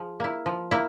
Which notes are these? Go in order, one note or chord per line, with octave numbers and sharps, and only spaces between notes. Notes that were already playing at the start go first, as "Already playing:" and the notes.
Already playing: F3 G#4
A#3 E4
F3
A#3 E4